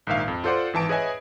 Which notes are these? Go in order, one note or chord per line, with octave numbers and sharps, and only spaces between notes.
A#1 G#2 D#3 E5 F5
F2
F4 A4 C5 D5 F#5
G#1 E3 A5 D7
G#4 B4 C#5 D#5 E5 G#5